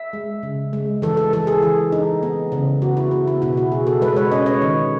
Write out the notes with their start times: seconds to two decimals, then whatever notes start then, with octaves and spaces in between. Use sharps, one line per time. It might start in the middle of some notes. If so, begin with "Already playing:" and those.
Already playing: E5
0.13 G#3
0.43 C#3
0.73 G#3
1.02 E3 A4
1.17 A4
1.33 E3 A4
1.47 G#4
1.62 E3
1.92 D#4
2.23 B3
2.52 C#3
2.82 B3 F#4
2.97 E4
3.11 B3
3.27 E4
3.42 B2 E4
3.57 F#4
3.72 B2 G#4
3.87 A4
4.02 G#3 B4
4.17 C#5
4.32 C#4 D#5
4.46 C#5
4.62 D#3